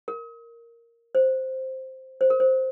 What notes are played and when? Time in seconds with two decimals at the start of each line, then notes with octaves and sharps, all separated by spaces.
0.08 A#4
1.15 C5
2.21 C5
2.30 A#4
2.40 C5